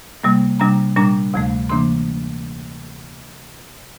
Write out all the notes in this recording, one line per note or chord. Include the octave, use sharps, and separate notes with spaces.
C3 G3 A#3
C3 G3 D4 A#5
A#2 G3 D4 A#5
D2 C3 F3 A3
C3 E3 A#3 D4 C6